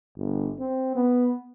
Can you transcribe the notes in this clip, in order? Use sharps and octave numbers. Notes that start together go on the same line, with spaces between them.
G1
C4
B3